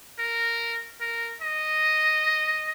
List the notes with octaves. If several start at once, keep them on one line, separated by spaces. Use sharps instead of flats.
A#4
A#4
D#5